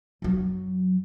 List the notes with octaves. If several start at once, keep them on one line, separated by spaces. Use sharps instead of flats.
F#2 F#3